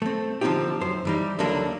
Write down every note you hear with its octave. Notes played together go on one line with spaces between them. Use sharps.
A3 C4
D3 F3 G#3 C4 D#4 G4
F#2 C5
E3 G3 D#4
C#2 D3 F#3 A#3 D4 A4